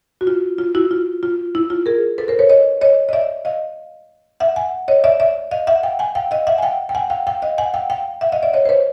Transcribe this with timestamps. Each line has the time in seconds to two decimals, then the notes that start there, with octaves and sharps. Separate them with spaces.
0.21 F#4
0.27 F4
0.58 F4
0.75 E4 F#4
0.91 F4
1.23 F4
1.55 E4
1.70 F4
1.86 G#4 A#4
2.18 A4 B4
2.28 A#4 C5
2.39 B4 C#5
2.49 C#5 D#5
2.81 C#5 D#5
3.09 D#5
3.13 D5 E5
3.45 D#5 F5
4.40 E5 F#5
4.56 F#5 G#5
4.88 C#5 D#5
5.04 D5 E5
5.20 D5 E5
5.51 D#5 F5
5.67 E5 F#5
5.83 F5 G5
5.99 F#5 G#5
6.15 F5 G5
6.31 D#5 F5
6.47 E5 F#5
6.58 G#5
6.62 F5 G5
6.89 G5
6.95 F#5 G#5
7.10 F5 G5
7.27 F5 G5
7.42 D#5 F5
7.58 F#5 G#5
7.74 F5 G5
7.90 F5 G5
8.21 E5 F#5
8.32 D#5 F5
8.43 D5 E5
8.53 C#5 D#5
8.65 C5
8.69 B4 C#5